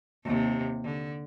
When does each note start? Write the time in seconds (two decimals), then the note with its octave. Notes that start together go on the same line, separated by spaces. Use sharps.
0.24 D#2 C3
0.84 D3